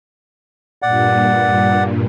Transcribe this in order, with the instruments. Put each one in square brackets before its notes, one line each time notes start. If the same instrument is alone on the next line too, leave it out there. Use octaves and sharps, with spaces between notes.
[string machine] G2 A#2 [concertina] D5 F#5